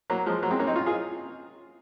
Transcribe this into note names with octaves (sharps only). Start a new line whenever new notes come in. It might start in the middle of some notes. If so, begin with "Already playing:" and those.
F#3 A#3
F3 G#3
F#3 A#3
G#3 C4
A#3 C#4
C4 D#4
C#4 F4
F4 G#4